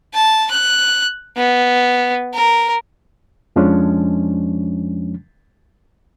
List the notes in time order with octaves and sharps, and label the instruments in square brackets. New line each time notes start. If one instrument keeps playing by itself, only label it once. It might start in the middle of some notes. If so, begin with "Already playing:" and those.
[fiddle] A5
F#6
B3
A#4
[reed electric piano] F2 F3 G#3 C#4 D4